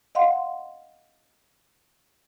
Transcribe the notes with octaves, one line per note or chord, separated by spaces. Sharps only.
D#5 F5 F#5 C6